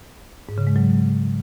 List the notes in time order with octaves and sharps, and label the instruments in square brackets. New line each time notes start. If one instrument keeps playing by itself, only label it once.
[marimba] G#2
C#3
G#3
F#3